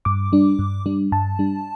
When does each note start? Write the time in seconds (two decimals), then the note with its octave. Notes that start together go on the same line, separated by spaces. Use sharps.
0.05 G2 D6
0.32 G3 D4
0.59 G2
0.86 G3 D4
1.12 G2 A5
1.39 G3 D4